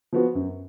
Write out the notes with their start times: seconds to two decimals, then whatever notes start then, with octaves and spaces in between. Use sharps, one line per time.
0.13 F3 B3 F#4
0.35 F#2